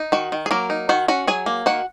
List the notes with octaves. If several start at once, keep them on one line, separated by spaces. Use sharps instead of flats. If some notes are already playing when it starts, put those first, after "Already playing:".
Already playing: D#4
D#3 F#4 F#5
D#3
G#4
F#3 A#3 A#4
D#4
D#3 F#4 F#5
C#4 F#4 F#5
F#3 G#4 G#5
A#3
D#3 F#4 F#5